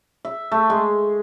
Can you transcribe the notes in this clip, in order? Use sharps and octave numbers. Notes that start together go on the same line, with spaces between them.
E5
A3
G#3